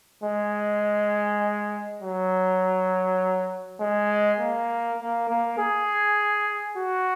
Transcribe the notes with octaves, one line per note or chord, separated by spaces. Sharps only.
G#3
F#3
G#3
A#3
A#3
A#3
G#4
F#4